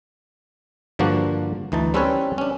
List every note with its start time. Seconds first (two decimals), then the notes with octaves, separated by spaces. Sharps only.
0.99 G2 D3 F3 A#3 D4 F#4
1.72 D2 E3 D#4 A5
1.94 G3 C4 C#4 A4 B4 C#5
2.38 C#4 D4